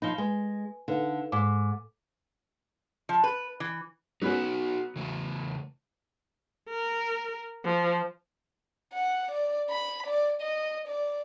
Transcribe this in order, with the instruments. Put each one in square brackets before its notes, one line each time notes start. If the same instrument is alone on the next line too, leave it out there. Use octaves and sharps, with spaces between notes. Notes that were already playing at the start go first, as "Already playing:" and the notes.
[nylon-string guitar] F3 D#4 [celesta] B5 A#6 G7
[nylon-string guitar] G#3 [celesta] B4 G#5
[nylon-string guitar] D3 [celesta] D#4 B4 F5
[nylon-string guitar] G#2 [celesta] D6
[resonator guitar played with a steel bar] F3
B4
E3
[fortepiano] F#3 B3 C#4 [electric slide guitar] D#4 F#4
[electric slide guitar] C#3 E3 A3
[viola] A#4
F3
[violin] F#5
D5
B5
D5
D#5
D5